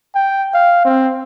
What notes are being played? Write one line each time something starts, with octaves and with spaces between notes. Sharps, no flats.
G5
F5
C4